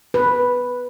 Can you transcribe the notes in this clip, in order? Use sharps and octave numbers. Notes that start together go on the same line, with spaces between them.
B4